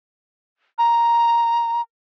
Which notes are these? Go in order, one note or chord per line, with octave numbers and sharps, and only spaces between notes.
A#5